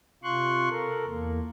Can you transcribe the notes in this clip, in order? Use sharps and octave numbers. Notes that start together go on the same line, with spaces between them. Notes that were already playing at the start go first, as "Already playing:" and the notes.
C3 F4 C6 C#6 F#6
A4 A#4
E2 A#3